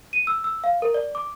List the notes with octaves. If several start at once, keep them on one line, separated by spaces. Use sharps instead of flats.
D#7
E6
E6
F5
A#4
D5
D6